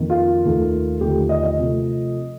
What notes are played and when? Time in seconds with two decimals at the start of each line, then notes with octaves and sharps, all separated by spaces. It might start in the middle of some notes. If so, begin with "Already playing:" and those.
Already playing: F2 D#3 A#3
0.10 F4
0.45 D#2 D#3 A3
1.01 D#2 D3 F3 A3 G4
1.29 D#5
1.44 D#5
1.58 C3 F3 A3